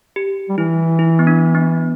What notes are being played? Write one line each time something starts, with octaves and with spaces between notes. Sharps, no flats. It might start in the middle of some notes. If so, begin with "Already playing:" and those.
G4
G3
E3 E4
E4
B3
D4
B3